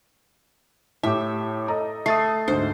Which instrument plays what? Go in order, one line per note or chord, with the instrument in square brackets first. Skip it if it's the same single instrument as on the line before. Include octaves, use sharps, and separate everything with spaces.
[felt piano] A2 G4 [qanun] E5
[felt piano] A4 D#5 A#5
[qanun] A3 [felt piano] D#6 A6 C7
[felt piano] D2 G#2 [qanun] C5